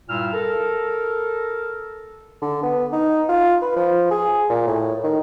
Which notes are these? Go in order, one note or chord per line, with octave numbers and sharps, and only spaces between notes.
G2 A#2 G3 E4 E6 F6
A4 A#4
D3
B3
D#4
F4
B4
F3
G#4
A#2
A2
D#3